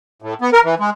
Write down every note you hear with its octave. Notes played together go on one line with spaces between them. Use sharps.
A2
B3
A#4
E3
G#3